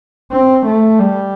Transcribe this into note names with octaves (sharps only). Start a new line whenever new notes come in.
C4
A3
G3